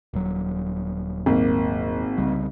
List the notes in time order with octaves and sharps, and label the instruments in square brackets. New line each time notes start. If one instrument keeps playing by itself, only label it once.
[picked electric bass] D#1 F#3
[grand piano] G#1 A#3
[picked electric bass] C2 C#3 G3